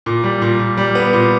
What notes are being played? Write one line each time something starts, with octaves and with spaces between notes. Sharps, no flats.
A#2
G3
A#2
A#2
G3
B3
A#2